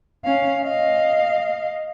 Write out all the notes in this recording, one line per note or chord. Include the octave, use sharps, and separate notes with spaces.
C#4 F5
D#5 F5